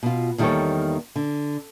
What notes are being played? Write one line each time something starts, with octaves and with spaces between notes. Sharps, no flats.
B2 F4
E2 D#3 G3 A#3 A4 C#5
D3